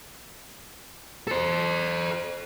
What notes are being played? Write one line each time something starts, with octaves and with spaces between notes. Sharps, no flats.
A4 C5